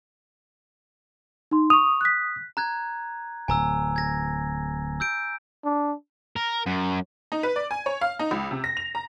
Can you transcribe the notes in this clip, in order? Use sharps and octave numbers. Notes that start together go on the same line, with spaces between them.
D#4 C6
C#6 D#6 F7
F#6 B6
A#5 F#6 G#6
D1 G#5 A#5 E6
G#6 A#6
E6 G6 D7
D4
A#4
F#2
D#4
B4
D5
G#5
C#5
F5
D#4
C#2
C3
A#6
F7
A#5